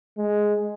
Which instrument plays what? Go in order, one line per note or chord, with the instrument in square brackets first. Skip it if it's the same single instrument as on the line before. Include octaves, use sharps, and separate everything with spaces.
[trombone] G#3